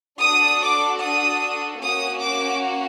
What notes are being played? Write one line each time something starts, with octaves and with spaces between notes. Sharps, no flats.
D4 F#4 A4 D#6
D6
D#6
A#3 C#4 F#4 D#6
D6